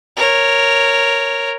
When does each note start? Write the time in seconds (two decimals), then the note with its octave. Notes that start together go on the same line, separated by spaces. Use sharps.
0.17 A#4 C#5